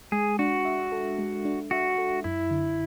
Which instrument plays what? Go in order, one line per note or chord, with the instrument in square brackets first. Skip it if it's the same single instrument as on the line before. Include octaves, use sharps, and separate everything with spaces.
[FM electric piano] G#3 [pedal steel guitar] G#4
[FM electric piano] D4 [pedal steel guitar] F#4
[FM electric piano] E5
A4
G#3
D4
[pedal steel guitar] F#4 [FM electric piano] E5
[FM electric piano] A4
[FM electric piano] F#2 [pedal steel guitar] E4
[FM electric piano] D3